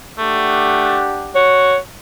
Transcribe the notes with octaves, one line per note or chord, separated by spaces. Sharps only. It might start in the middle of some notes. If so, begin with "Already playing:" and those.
A3 D4 G4 F#5
F#4 C#5